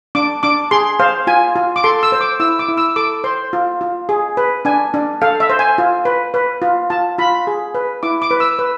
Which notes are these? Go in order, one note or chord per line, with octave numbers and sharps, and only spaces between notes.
D4 D6
D4 D6
G#4 C6
C5 F5
F4 G#5
F4
D6
A4 C6
E6
C5
D6
E4 E6
D6
E4
E6
A4 D6
C5 C6
F4
F4
G#4
B4
D4 G#5
D4
A4 F5
E5
C5
G#5
F4
B4
B4
F4
F4 A5
F4 B5
G#4
B4
E4 D6
D6
B4
E6
B4